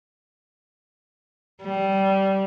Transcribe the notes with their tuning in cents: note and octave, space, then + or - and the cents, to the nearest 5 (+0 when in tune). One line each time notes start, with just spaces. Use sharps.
G3 -15